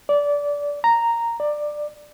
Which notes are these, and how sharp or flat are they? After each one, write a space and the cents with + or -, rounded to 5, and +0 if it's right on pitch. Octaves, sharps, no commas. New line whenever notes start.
D5 -20
A#5 -5
D5 +15